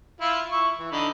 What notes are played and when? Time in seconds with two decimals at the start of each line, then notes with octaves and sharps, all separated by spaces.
0.21 E4 F4
0.51 E4 C#6
0.79 E3
0.92 D3 D#4 B5